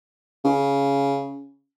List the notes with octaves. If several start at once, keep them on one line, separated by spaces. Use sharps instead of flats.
C#3